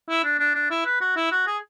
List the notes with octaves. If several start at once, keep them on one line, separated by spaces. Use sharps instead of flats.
E4
D4
D4
D4
E4
B4
F#4
E4
F#4
G#4